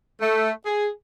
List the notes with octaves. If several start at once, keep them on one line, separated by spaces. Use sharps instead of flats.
A3
G#4